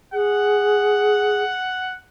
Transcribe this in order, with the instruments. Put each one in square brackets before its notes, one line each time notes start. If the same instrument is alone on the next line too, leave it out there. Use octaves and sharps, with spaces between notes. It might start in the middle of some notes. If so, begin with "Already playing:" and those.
[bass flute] G#4 [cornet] F#5